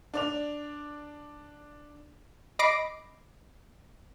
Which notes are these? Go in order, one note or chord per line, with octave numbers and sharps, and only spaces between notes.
D4 D5 F7
D#5 B5 D6 A#6 C7 D7